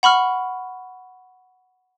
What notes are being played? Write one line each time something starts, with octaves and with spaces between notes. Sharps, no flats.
F#5 B5 C#6 F6